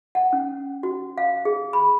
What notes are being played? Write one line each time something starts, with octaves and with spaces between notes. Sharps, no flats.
F#5
C#4
F#4
F5
G#4
B5